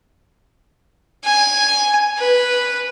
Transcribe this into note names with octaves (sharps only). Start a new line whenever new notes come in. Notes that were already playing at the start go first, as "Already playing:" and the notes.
G#5
B4